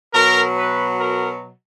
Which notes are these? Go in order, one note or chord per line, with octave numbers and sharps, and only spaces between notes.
B2 F#3 A#4
B4
A#4